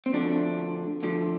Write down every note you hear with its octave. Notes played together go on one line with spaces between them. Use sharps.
C4
D2 D3 F3 D4
D2 D3 F3